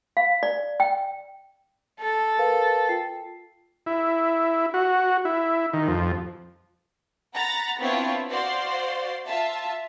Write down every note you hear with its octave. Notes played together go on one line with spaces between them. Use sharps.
F5
D5
G5
A4
A#4 B4 F5
F4 G5 C7
E4
F#4
E4
D#3
F2
F#5 A#5 B5 A6
B3 C4 D4 E4 F4 C#5
F#4 C5 D5 F5 C6
F4 E5 A5